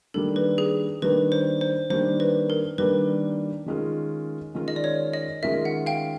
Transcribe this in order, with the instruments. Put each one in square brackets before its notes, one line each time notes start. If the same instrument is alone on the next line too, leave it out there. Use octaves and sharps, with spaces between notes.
[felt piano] D#3 G3 A#3 D4 [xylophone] A4
[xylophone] B4
G#4
[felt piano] D#3 G3 A#3 D4 [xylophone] B4
[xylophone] C5
C5
[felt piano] D#3 G3 A#3 D4 [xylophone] C5
[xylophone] B4
A#4
[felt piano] D#3 G3 A#3 D4 [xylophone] B4
[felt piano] D#3 G#3 C#4 F4 A#4
D#3 G#3 C#4 F4 A#4
[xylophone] D#5
D5
C#5
D#5
[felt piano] D#3 G#3 C#4 F4 A#4 [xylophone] E5
[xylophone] F#5
F5 G5